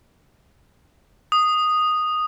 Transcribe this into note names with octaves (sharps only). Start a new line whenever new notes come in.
D#6